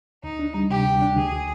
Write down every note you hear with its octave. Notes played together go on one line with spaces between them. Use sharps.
D2 D#4
D4
G3
C3 G4
D2
D4
D2 G#4